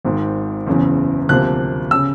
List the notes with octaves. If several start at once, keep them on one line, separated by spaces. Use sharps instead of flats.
G#1 G#2 D#3
F#1 E2 C#3 E3
D2 C3 F3 A#3 F#6
C#3 E6